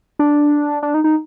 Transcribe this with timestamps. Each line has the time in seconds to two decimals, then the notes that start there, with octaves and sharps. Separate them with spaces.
0.19 D4
0.83 D4
0.94 D#4
1.04 D#4